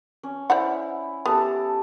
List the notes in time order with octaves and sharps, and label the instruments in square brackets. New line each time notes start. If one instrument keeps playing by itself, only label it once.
[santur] C#4
[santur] E4 [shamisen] C5 D5 F#5
[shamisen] B3 [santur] G4 A4